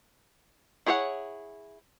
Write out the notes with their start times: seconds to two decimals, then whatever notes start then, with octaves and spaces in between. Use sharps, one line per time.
0.86 E4 G#4 C#5 D5 F#5